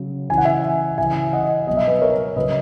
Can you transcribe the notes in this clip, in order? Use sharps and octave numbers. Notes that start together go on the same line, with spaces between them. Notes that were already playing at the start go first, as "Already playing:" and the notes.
Already playing: C#3 F#3
C#3 E3 G#5
F#5
E5 G#5
C#3 E3 E5 G#5
D#5 F#5
B2 F#3 D#5
E5
B4 D#5
A#4 C#5
C#3 F#3 B4 D#5